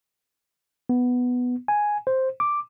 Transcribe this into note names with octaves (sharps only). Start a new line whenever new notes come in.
B3
G#5
C5
D6